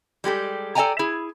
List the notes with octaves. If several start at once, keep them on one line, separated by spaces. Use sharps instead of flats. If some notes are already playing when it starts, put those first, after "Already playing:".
G3 G#3 G4 A4
A4 D5 F5 G5 G#5 A#5
E4 G#4